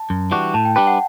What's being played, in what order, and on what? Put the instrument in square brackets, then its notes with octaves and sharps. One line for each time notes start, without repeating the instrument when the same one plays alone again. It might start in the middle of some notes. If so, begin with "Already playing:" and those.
Already playing: [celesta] A5
[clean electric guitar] F#2
E3 G3 D4 F#4
[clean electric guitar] A2 [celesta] A5
[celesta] G5
[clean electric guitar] G3 D4 G4 B4 [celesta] G5
[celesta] F#5